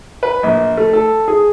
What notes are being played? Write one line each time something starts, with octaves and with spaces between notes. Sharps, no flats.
B4
A#1
A3
A4
G#4